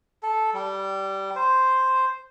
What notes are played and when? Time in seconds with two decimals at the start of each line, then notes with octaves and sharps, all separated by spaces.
0.23 A4
0.54 G3
1.36 C5